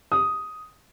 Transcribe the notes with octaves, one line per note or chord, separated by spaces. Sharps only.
D#6